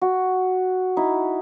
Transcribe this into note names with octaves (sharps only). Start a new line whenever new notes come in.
F#4
D#4 E4